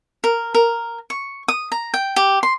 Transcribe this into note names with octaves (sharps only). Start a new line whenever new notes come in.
A#4
A#4
C#6
D#6
A#5
G5
G4
C6